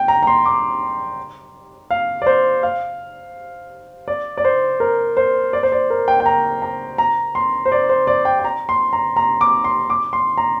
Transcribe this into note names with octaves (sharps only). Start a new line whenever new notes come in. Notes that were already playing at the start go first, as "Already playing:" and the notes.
Already playing: G5
A#5
A#5
C6
D6
F5
D5
C5
F5
D5
D5
C5
A#4
C5
D5
C5
D5
A#4
G5
G5
A#5
A#5
A#5
C6
C5
D5
C5
D5
G5
G5
A#5
C6
A#5
A#5
D6
C6
D6
C6
A#5